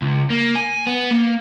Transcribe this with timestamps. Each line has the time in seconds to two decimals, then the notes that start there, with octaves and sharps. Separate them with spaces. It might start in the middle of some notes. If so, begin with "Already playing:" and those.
0.02 C#2
0.30 A#3
0.56 G#5
0.87 B3
1.11 A#3